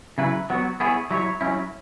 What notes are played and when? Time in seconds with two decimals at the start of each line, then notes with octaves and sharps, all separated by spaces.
0.18 C#3 F#3 E4 B4
0.50 F#3 B3 F#4
0.80 B3 E4 G#4 C#5
1.11 F#3 E4 C#5
1.41 F#3 C#4 E4